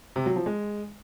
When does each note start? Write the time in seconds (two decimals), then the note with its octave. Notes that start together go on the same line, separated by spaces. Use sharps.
0.16 C3
0.26 F#3
0.36 F3
0.46 G#3